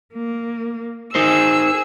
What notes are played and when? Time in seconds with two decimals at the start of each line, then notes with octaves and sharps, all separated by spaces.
0.14 A#3
1.15 D#4 G#4 A#4 C5 E6